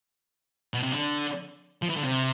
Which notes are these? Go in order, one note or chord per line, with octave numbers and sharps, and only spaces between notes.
B2
C3
D3
F3
E3
D3
C3